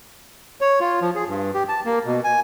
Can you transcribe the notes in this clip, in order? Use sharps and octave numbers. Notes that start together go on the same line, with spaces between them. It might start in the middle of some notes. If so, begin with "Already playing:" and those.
C#5
F4
F3
G#4
G2
G4
A5
A#3
B2
G#5